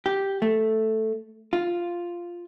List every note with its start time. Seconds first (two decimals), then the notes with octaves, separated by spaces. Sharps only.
0.06 G4
0.42 A3
1.53 F4